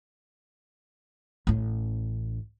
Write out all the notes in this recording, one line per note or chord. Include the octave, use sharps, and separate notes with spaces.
A1 C#4